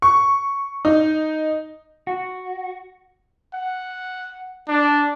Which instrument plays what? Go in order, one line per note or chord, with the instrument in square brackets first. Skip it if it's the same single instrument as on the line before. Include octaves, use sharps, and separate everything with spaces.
[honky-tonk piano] C#6
D#4
[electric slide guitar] F#4
[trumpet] F#5
D4